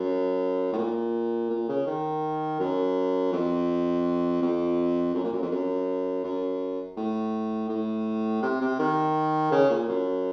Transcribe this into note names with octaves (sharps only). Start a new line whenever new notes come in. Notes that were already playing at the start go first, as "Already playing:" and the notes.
Already playing: F#2
A2
A#2
A#2
C#3
D#3
F#2
F2
F2
F#2
A#2
F#2
F2
F#2
F#2
A2
A2
C3
C3
D#3
C#3
A#2
F#2